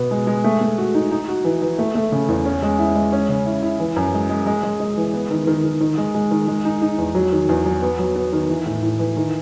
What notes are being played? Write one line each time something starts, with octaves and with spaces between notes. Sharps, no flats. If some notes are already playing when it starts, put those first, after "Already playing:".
Already playing: B2 B3
G#3
G#3
A3
A3
F#4
D#4
D#4
F#4
E3
E3
A3
A3
C#3
E2
C#4
G#3
E4
G#3
C#4
C#3
E4
E4
E3
F#2
G#3
G#3
G#3
G#3
G#3
E3
B3
D#3
D#3
D#3
D#3
G#3
G#3
D#3
G#3
D#4
D#4
E2
F#3
D#3
E2
F#3
B3
F#3
B3
D#3
E3
A2
A2
E3
D#3